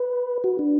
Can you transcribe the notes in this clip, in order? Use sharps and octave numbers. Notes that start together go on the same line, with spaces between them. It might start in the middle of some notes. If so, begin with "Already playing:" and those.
Already playing: B4
F#4
D4